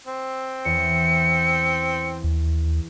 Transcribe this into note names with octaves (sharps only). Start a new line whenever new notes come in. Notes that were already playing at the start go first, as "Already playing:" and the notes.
C4
E2 C#7
D#2